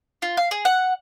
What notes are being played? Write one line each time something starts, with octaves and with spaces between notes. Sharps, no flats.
F4
F5
G#4
F#5